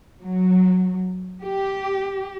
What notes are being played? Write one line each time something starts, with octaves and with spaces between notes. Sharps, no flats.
F#3
G4